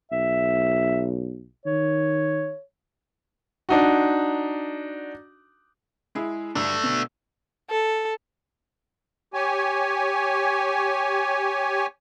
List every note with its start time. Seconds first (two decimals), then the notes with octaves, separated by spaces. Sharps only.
0.12 B1 E5
1.65 D#3 C#5
3.69 D4 D#4 F#4
6.15 G#3 E4 G#4
6.55 G2 A3 D4
6.83 B2
7.70 A4
9.34 G4 C#5 G#5